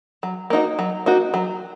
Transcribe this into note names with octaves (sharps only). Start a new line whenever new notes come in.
F#3
A#3 D#4 F#4
F#3
A#3 D#4 F#4
F#3